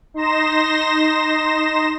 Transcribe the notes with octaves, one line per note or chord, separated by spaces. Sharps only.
D#4 C6 A#6 E7